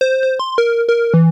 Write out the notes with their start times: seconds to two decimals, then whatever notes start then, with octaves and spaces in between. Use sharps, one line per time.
0.01 C5
0.23 C5
0.40 C6
0.58 A#4
0.89 A#4
1.14 E3